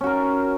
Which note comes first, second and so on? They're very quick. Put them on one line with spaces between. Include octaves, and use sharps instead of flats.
C#4 F#4 A#4